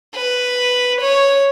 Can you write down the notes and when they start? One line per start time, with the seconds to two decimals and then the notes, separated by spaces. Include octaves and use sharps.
0.16 B4
1.01 C#5